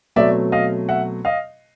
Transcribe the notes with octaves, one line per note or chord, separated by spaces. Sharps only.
B2 F#3 A3 C4 D5 E5
D#5 F5
E5 F#5
D#5 F5